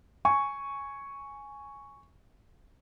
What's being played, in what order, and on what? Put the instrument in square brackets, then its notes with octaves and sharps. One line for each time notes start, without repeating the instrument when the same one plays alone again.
[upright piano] G#5 C#6